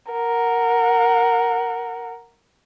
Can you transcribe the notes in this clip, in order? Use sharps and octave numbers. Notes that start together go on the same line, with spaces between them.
A#4 F#5